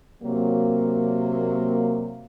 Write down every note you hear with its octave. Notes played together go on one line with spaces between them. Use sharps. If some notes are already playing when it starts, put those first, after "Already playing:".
C3 F#3 A#3